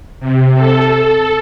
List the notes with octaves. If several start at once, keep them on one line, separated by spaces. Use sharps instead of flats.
C3
A4